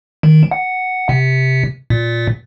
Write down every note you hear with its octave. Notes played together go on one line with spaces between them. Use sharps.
D#3
F#5
C3
A#2